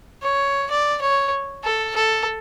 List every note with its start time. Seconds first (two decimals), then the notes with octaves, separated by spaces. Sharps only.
0.23 C#5
0.70 D5
1.02 C#5
1.64 A4
1.96 A4